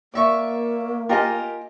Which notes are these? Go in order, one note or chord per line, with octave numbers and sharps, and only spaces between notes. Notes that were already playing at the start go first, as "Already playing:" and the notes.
A#3 D5 E5 C#6
F4 G4 A#4 D#5 G#5